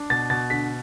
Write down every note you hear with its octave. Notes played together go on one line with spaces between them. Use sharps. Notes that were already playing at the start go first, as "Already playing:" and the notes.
Already playing: D4
B2 A6
B2 A6
D3 B6